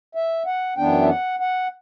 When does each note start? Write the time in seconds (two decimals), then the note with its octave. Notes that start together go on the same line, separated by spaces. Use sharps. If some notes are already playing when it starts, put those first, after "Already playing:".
0.15 E5
0.46 F#5
0.77 F#2 E3 B3 D4 G5
1.02 E5
1.08 F#5
1.39 F#5